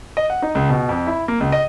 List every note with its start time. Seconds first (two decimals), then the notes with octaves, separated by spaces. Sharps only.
0.17 D#5
0.30 F#5
0.42 D#4
0.55 C#2
0.70 B2
0.89 F2
1.07 E4
1.28 A#3
1.40 C#2
1.52 D#5